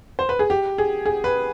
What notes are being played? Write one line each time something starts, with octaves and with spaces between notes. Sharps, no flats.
C5
B4
G#4
G4
G#4
G#4
B4